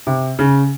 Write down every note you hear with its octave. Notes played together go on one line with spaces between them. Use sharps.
C3
C#3